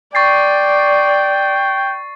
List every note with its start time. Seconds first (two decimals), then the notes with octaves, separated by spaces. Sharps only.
0.15 D5 G5 C#6 A6 C7